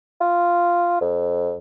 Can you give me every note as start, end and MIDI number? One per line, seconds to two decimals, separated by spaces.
0.21 0.99 65
1.01 1.58 41